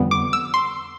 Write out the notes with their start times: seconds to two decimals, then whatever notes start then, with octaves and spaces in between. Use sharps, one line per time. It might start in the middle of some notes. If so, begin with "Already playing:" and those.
Already playing: F2 D3 G3 B3
0.11 D6
0.33 E6
0.54 C6